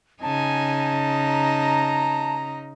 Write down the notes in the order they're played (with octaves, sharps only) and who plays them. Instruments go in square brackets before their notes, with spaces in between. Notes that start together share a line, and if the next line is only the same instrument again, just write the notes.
[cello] C#3 D#4 [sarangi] G#5 [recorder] A5
[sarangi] A#5